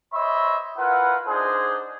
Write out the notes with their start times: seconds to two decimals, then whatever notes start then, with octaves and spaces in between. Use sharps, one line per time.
0.13 C5 C#5 D#5 E5 B5 C6
0.78 E4 F4 A#4 B4 F#5
1.28 D4 D#4 G#4 C5